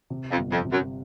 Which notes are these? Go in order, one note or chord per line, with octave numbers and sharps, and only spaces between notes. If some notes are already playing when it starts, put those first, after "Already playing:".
C3
F2
G1
F2
C3
F#2